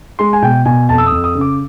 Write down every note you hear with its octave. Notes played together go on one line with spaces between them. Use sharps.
G#3 C6
G#5
B2 G5
B2 G#5
F2 A5
E6
D#6
F2
D#6
C#3
D6